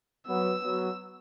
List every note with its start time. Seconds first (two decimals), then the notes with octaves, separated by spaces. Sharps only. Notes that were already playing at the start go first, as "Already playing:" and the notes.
0.27 F#3 B3 E6
0.63 F#3 B3